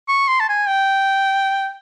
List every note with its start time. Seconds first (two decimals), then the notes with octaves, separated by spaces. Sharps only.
0.08 C#6
0.28 C6
0.40 A5
0.49 G#5
0.68 G5